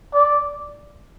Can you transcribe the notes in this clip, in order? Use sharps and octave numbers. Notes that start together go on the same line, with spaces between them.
D5